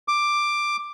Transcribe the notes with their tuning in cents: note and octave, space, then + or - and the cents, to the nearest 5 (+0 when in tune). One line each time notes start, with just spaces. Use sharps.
D6 +10